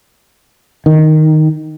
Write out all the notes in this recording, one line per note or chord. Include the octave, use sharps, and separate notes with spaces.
D#3